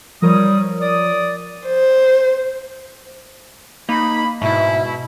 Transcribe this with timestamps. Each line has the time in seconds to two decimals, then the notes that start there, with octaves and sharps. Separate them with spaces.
0.22 F3 G3 A#4 C#5 D#6
0.81 D5 D#6
1.68 C5
3.89 A#3 D#4 B5
4.42 G#2 B2 E4 E5